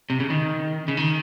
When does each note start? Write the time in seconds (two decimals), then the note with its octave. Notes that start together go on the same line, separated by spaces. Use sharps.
0.10 C3
0.20 C#3
0.30 D#3
0.88 C#3
0.97 D#3